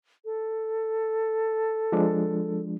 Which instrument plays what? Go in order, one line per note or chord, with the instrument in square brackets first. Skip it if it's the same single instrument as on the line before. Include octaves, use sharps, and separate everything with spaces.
[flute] A4
[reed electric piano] F3 G#3 D4